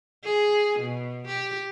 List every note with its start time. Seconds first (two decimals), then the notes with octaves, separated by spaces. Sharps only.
0.24 G#4
0.79 B2
1.27 G4